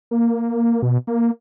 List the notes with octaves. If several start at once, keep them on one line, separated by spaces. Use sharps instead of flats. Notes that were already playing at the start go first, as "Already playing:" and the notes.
A#3
B2
A#3